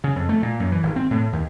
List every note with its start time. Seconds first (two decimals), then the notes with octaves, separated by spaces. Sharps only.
0.04 C#3
0.16 F2
0.29 A3
0.42 A#2
0.60 F#2
0.72 E3
0.83 G#1
0.96 C4
1.11 A2
1.33 D#2